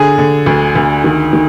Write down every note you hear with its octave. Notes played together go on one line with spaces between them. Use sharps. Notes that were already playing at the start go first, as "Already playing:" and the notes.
Already playing: D3 G#4
D3
D2
D2
D#3
D#3